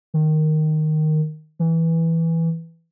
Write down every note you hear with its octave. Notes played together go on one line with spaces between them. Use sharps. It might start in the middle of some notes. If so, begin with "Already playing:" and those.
D#3
E3